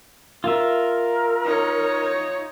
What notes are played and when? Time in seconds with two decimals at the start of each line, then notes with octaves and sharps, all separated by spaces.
0.44 F4 A#4 E5
1.44 D#4 C#5